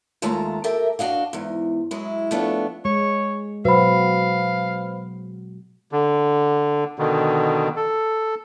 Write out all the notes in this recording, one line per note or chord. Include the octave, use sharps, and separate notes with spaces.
D#2 G#3 A3 F4 A5 A#5
G4 A4 A#4 E5
D4 F#4 D#5 F5
E2 G#2
F#3 G#3 E4
F3 A3 B3 D4 C#5
G#3 C#5
B2 F#3 F#4 B4 C5 F5 B5
D3
B2 D3 D#3
A4